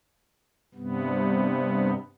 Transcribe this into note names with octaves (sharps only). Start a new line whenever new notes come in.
G2 C3 B3